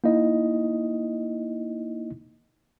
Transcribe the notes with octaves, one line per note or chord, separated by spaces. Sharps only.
A#3 D#4 E4 D#5